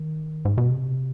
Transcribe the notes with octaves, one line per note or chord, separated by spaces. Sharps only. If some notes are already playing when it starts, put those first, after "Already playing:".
Already playing: D#3
G#2
B2
C3